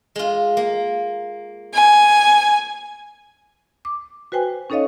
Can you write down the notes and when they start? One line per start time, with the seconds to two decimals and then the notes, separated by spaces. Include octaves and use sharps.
0.16 G#3 F4
0.57 A#3
1.73 G#5
3.85 D6
4.32 F#4 B4 C5 G5 G#5
4.70 C#4 D#4 A4 C#5 D#5 F5